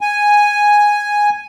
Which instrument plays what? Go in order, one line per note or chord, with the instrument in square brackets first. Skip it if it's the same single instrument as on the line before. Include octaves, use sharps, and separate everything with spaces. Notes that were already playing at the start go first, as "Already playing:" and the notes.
[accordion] G#5